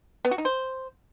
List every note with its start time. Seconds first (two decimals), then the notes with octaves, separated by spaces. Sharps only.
0.25 B3
0.31 F#4
0.38 D#4
0.45 C5